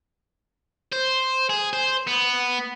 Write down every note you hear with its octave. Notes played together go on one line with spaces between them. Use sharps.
C5
G#4
C5
B3